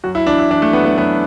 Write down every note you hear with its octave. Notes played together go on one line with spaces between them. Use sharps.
F#2 F#4
E4
E3 D4
E4
E3 D4
A3
F#2 B3
B3
F#2 B3